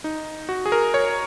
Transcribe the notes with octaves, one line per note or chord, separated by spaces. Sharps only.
D#4
F#4
G#4
A#4
C#5